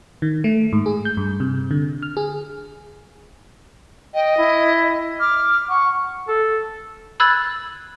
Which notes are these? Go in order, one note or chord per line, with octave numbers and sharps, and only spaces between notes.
D#3
A3
G#2
G#4
G6
G2
C3
D3
F6
G#4
D#5 G5
E4
D6 F6
F#5 C#6
A4
B5 E6 F#6 G#6 A6